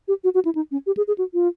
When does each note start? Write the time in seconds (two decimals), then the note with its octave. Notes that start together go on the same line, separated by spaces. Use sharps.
0.08 G4
0.24 F#4
0.34 F#4
0.45 E4
0.55 D#4
0.71 C#4
0.87 G4
0.97 G#4
1.08 G#4
1.18 F#4
1.34 F4